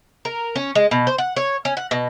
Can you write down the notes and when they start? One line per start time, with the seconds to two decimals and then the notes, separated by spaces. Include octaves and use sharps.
0.25 A#4
0.56 C#4
0.75 G#3
0.91 B2
1.07 C5
1.18 F#5
1.36 C#5
1.65 C#4
1.77 F#5
1.91 B2